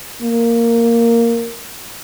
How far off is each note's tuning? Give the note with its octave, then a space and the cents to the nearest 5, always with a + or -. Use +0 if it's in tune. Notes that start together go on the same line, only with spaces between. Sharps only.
A#3 -5